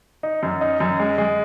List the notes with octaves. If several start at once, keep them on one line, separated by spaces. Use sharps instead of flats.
D#4
F#2
D#4
F#2
G#3
G#3